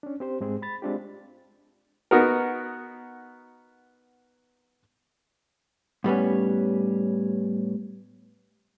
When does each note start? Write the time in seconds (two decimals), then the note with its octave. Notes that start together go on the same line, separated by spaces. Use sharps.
0.03 C#4 D4
0.20 C4 G4 C5
0.41 G#2 G#3 C4 G#4
0.62 B5 A6
0.82 G#3 C4 D4 F4 G4
2.11 B3 D#4 F#4 A#4
6.04 A2 G3 B3 C#4